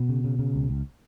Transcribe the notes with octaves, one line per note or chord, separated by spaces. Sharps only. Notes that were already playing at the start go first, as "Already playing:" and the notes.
Already playing: B2 B3
C#3
C#3
C#3
C#2
C#2